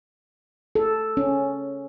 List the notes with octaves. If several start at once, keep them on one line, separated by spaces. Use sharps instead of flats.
A4
C#4